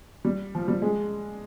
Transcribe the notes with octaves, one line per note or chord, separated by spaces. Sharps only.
G3
F3
G3
G#3